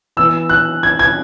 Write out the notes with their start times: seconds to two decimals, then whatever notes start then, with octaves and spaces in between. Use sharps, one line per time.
0.17 E3 B3 E6
0.49 F#6
0.83 G#6
0.99 G#6